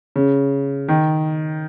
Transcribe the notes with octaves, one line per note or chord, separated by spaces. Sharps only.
C#3
D#3